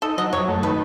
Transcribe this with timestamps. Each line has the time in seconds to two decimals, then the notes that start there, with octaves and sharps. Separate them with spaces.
0.02 D#4 A4
0.18 F#3 D#5
0.33 F#2 C#5
0.48 A3
0.62 D#3 B4